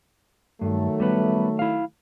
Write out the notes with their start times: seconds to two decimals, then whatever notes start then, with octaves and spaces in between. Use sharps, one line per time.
0.61 G2 D#3 F#3 A3
1.00 G3 B3 B4
1.59 E4 F5